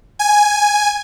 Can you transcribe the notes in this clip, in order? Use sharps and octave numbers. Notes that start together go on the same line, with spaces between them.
G#5